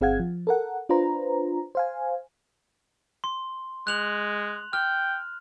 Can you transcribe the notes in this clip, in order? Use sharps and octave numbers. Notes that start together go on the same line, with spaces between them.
G1 C4 G#4 F5 F#5 G#6
F3
A4 A#4 F#5
D4 F4 B4 C5 A#5
C5 F5 G#5
C6
G#3 F#6 F7 F#7
G5 F6